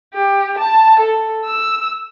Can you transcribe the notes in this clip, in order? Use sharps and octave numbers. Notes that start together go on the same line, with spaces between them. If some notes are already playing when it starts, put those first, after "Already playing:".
G4
A5
A4
E6